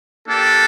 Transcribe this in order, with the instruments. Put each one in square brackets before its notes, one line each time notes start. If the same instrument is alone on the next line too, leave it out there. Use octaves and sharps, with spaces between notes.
[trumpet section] A#3 D4 G4 A4